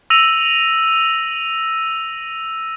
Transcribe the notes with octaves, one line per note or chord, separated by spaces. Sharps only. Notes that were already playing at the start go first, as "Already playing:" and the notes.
E6 A#6 D#7 F7 F#7